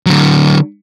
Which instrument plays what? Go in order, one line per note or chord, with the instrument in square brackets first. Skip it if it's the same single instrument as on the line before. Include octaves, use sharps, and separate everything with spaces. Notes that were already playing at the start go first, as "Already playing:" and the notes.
[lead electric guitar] D3 F#3